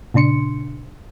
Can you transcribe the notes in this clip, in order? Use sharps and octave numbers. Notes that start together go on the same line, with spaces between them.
A#2 C#3 D4 C6 C#7